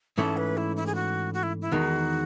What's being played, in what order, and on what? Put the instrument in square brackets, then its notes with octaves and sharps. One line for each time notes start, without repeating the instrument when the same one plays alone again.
[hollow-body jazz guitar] G#2 E3 A3 C#4 [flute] A5
[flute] B4
E4
E4
G#4
F#4
F#4
E4
E4
[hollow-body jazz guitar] E2 D#3 G#3 D#4 [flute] F#4